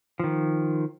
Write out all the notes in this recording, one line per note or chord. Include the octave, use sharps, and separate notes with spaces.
D#3 F3